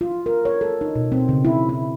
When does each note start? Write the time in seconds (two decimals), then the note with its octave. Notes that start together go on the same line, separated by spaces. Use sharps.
0.01 F4
0.26 A#4
0.45 C#5
0.61 A4
0.81 D#4
0.96 B2
1.12 C4
1.29 C#3
1.45 E4
1.69 E4